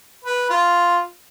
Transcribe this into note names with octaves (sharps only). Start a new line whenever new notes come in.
B4
F4